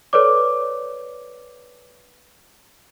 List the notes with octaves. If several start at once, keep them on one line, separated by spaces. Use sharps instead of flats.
A4 B4 C#5 D5 D6